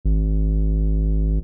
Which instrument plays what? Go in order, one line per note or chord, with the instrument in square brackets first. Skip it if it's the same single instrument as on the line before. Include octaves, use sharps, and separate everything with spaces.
[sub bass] G#1